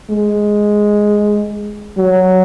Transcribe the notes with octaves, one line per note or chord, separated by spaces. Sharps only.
G#3
F#3